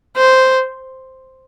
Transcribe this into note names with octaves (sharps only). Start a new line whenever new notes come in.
C5